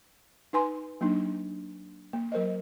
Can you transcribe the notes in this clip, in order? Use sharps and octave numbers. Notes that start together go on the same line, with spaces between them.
D#4 B4 G#5 C6
F#3 A#3 D4 D#4
A#3
F#3 A#4 C5 D#5